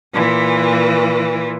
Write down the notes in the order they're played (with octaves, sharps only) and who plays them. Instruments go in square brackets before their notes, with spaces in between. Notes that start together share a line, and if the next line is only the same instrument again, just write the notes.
[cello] A#2 E3